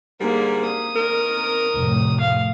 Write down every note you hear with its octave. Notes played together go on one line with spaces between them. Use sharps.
G#2 D3 G3 A#3 G#4
D#6
D#3 A#4
F1 A2
F5